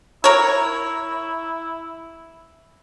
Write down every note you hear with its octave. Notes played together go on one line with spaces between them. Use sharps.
E4 A#4 C#5